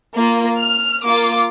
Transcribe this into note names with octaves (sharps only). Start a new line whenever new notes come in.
A#3 F4
F6
A#3 F4 D6